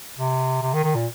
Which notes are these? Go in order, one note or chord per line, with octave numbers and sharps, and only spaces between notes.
C3
C3
D#3
D#3
A#2